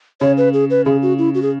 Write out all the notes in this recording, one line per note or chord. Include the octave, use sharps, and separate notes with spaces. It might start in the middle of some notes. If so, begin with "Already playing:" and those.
C#3 C#5
B4
G#4
B4
C#3 G#4
F#4
E4
F#4
G#4